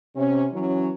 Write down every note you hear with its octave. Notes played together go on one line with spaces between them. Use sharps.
C3 C#4
E3 F#3 C#4